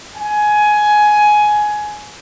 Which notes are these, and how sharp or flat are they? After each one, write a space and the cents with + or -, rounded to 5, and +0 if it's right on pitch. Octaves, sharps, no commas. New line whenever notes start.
G#5 +15